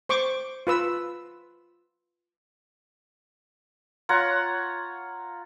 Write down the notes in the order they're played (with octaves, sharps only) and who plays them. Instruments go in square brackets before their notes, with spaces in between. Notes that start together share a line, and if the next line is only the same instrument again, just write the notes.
[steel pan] C5 C#6 D6
F4 B4 E6
[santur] F4 C#5 F#5 A#5